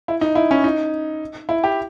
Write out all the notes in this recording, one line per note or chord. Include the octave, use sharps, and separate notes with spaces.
E4
D#4
E4
C#4
D#4
E4
G4